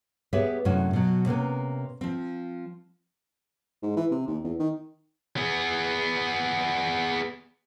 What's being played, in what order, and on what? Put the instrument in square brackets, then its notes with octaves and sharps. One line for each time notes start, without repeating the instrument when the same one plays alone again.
[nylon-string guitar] B3 G4 G#4 B4 C#5 E5
F#2 A2 C3 C#4 D4 F#4
B2 F#3
C3 A#3 B3 C#4
F3 C4
[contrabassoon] G#2
E3
C3
D#2
E2
D#3
[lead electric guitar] B3 G#4